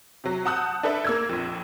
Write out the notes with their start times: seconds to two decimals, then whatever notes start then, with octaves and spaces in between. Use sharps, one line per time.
0.24 C3 F#3
0.45 F#5 A5 D#6 E6 F#6 G6
0.83 D4 A4 B4 E5
1.05 A#3 E6 G#6
1.29 A#1 F2